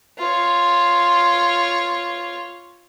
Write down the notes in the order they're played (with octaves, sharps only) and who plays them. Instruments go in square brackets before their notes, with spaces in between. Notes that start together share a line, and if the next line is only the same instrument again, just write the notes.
[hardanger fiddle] F4 C#5